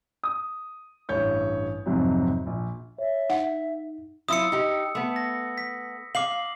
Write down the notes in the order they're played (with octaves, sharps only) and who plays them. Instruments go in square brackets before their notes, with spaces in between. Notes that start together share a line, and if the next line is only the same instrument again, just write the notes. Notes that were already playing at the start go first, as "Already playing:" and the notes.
[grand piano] D#6
A1 G2 C#5 G6
F2 G#2 C3 F#3 C4
A#1
[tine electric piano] C#5 [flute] E5
[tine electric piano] D#4 [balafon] F#5
[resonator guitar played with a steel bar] F#3 E4 F4 [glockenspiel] D#6 E6 C#7
[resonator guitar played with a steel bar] D#4 G4
A3 B3
[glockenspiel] A#6
B6
[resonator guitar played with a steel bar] F5 [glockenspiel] D6 C7 F#7